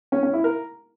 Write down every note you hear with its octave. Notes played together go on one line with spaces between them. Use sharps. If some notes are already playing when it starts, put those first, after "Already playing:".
C#4
C#4
E4
A#4